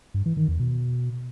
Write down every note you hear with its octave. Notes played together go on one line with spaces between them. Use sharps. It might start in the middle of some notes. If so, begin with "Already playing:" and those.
G2
E3
D#3
E2
B2